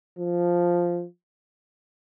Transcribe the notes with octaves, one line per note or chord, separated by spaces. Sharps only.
F3